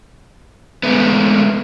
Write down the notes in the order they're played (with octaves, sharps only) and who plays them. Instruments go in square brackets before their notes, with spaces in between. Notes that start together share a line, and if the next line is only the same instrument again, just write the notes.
[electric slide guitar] G#3 A3 B3